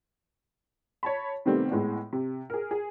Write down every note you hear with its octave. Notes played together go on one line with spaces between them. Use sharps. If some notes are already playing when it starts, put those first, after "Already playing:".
C#5 A5 B5
C3 D#3 G3 A3 B3 C4
A2 G#3 B3
C3
G#4 A#4
G#4